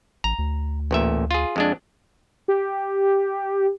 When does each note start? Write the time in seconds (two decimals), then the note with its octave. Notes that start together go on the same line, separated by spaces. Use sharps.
0.24 A1 A#5
0.39 D2
0.91 A1 A#2 E5
1.31 F4 G#4
1.56 F2 G#3 D4
2.48 G4